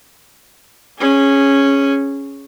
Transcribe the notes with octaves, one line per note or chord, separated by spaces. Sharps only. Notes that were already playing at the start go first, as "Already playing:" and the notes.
C#4 G#4